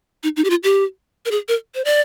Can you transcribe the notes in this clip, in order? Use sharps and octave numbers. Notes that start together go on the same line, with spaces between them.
D#4
D#4
G4
F4
G4
A#4
G#4
A#4
C5
D5